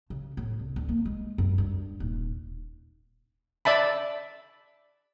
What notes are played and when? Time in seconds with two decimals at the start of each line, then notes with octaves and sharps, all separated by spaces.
0.10 C#3
0.37 A2
0.59 C2
0.76 D2
0.89 A#3
1.06 G#3
1.38 F#2
1.58 G2
2.00 D#1
3.65 D5 E5 A5 B5